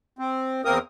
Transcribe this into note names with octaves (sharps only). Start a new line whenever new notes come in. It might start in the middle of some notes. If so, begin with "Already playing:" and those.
C4
E2 A#3 C4 A#4 D#6